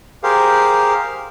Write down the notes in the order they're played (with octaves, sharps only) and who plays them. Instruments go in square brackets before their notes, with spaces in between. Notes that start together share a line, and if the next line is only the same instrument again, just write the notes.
[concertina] G4 G#4 A#4 C5 F5